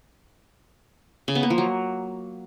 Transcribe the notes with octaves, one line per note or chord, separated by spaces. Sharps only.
C#3
B3
A#3
F3
F#3